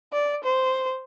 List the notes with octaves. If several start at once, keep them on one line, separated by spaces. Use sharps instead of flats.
D5
C5